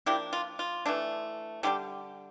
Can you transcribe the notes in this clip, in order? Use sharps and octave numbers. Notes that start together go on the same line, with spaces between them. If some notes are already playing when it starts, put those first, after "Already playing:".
F3 A#3 D4 E4 G4
F4
F4
E3 A3 D4
D3 G3 D4 E4 G4